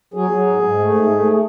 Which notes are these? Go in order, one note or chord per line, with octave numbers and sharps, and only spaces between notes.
F#3 G#4
F#3
G#2
G#2
A3
G#2
A3